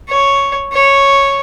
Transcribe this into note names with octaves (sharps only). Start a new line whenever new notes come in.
C#5
C#5